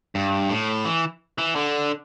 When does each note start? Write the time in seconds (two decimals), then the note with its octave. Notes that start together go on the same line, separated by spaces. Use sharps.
0.15 G2
0.49 A2
0.85 E3
1.38 E3
1.56 D3